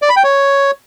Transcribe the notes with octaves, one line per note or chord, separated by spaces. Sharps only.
D5
B5
G5
C#5